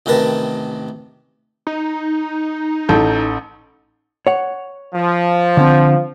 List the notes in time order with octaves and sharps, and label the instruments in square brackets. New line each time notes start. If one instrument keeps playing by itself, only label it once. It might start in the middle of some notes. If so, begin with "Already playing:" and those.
[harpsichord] A1 C3 D#3 A#4 B4 A5
[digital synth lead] D#4
[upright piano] A1 A4 G6
[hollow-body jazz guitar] C#5 F#5
[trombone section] F3
[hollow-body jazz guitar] D3 C4